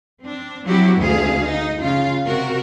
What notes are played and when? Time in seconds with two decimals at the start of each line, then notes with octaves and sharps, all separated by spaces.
0.20 C4 D4
0.64 F#3 C4 E4 F#4 G4
0.98 D2 C4 G#4 F5
1.44 D#4
1.81 C#3 F4 F5
2.26 C3 F#4 A#4